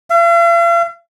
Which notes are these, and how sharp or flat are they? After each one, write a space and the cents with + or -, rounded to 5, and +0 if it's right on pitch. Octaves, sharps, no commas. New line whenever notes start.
F5 -45